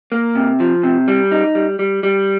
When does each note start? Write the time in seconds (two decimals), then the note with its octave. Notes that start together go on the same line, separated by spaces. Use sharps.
0.12 A#3
0.35 C3
0.60 F3
0.83 C3
1.08 G3
1.31 D#4
1.55 G3
1.79 G3
2.03 G3